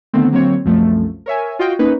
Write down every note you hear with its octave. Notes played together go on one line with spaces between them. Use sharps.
D3 D#3 A3 B3 C4
D3 F#3 A#3 C4 C#5
C2 F#2 F3 A3
A#4 C#5 E5 G#5
F4 F#4 D#5 F5 G5
A#3 C#4 D#4 B4 C#5